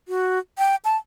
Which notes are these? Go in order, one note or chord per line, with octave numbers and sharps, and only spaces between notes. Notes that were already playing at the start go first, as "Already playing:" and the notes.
F#4
G5
A5